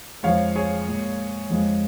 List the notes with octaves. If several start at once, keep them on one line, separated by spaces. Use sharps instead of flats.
F2 F3 G#3 C#5 F5
G#4 C#5
A#2 G#3
F2 F3 G#3